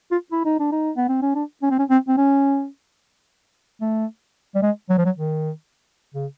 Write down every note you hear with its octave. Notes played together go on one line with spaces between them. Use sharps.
F4
E4
D#4
D4
D#4
B3
C4
C#4
D4
C#4
C4
C#4
C4
C4
C#4
A3
G3
G#3
F#3
F3
F#3
D#3
C#3